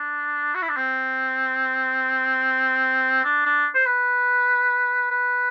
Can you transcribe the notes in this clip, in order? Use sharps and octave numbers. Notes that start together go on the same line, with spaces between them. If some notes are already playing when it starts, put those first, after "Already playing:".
Already playing: D4
F#4
E4
D4
C4
D4
D4
C5
B4
B4